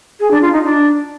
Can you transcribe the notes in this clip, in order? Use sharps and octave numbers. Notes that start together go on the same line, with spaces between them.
G#4
D4
F4
D#4
D4